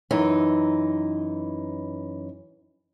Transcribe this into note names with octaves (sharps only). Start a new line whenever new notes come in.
F#2 E3 D#4